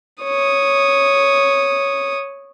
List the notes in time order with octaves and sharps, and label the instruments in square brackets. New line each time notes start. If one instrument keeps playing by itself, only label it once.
[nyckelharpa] C#5 D#6